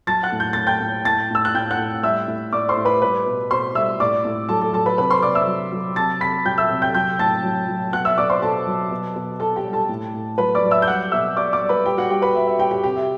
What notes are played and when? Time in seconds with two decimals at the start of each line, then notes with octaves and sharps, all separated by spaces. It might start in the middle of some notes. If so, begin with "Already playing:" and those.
0.07 F#3 A5 A6
0.23 F#5 F#6
0.32 A2
0.40 G6
0.53 A2 A6
0.67 G5 G6
0.81 A2
1.05 A2 A5 A6
1.31 A2 E6
1.45 F#6
1.54 A2 G5 G6
1.71 F#5 F#6
1.79 A2
2.03 G3 E5 E6
2.28 A2
2.53 A2 D5 D6
2.69 C5 C6
2.77 A2
2.85 B4 B5
3.02 G3 B4 B5
3.26 B2
3.51 B2 C5 C6
3.75 G3 E5 E6
4.00 A2 D5 D6
4.25 A2
4.49 F#3 A4 A5
4.61 A4 A5
4.73 F#3 A4 A5
4.86 B4 B5
4.98 C3 B4 B5
5.11 C5 C6
5.22 C3 D5 D6
5.35 E5 E6
5.47 F#3
5.72 F#3
5.96 C3 A5 A6
6.21 C3 B5 B6
6.46 F#3 G5 G6
6.58 E5 E6
6.70 C3
6.82 G5 G6
6.94 F#3 G5 G6
7.19 A2 A5 A6
7.44 F#3
7.68 F#3
7.93 B2 F#5 F#6
8.05 E5 E6
8.18 B2 D5 D6
8.29 C5 C6
8.42 B2 A4 A5
8.67 F#3
8.91 B2
9.16 B2
9.40 B2 A4 A5
9.56 G4 G5
9.65 G3
9.73 A4 A5
9.89 A2
10.14 A2
10.38 F#3 B4 B5
10.55 D5 D6
10.64 F#3
10.71 E5 E6
10.82 G6
10.88 G3 F#5 F#6
11.12 B2 E5 E6
11.36 B2 D5 D6
11.53 D5 D6
11.61 G3
11.69 B4 B5
11.86 G3 G4 G5
11.98 F#4 F#5
12.10 G3 G4 G5
12.22 B4 B5
12.35 G3 E5
12.47 E5
12.59 G3 G4 G5
12.71 G4 G5
12.83 C3 G4 G5
12.96 E5